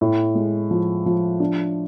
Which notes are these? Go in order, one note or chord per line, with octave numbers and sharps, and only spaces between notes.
A2
G#3
F3
F3
D4